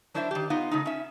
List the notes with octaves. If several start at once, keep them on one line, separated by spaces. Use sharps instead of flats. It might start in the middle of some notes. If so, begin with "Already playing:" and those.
F#3 D4 E4 C5 C#5 E5
D#3 G4
B3 D#4 F4 F#5
C#3 A3 D#4
C#4 E5